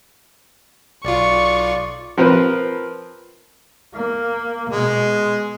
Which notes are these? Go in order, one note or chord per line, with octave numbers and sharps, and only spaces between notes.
B1 F4 D5 C#6
F3 C4 A#4 B4
A#3
B2 G#3